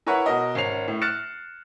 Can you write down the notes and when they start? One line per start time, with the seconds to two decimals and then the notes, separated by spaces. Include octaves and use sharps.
0.07 E4 A#4 B4 C#5 F#5
0.26 B2 F#4 A#4 D#5
0.55 G#1 C#4 C7 F7
0.88 A2
1.01 F6 F#6 A6 C#7 E7